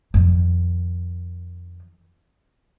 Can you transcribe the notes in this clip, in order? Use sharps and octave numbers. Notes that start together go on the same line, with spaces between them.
F2 D#3